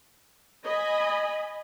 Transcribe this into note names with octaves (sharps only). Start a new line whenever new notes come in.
D#5 G#5 B5